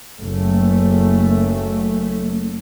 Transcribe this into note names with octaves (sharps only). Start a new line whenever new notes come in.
F#1 A3